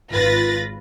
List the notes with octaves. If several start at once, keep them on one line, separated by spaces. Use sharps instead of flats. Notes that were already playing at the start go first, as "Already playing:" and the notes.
G#1 F4 B4 B5 A6 A#6